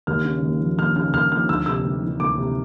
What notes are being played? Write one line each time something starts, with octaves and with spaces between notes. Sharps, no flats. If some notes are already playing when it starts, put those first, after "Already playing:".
D#2 F6
C#3
D#2
F3
D#2 F6
C#3 F6
D#2 F6
F3 F6
D2 E6
C3 E6
D2
E3
D2 D6
C3